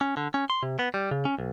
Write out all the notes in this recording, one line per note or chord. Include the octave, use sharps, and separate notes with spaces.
C#4
D3
C#4
C6
C3
B3
G3
C#3
C#4
B1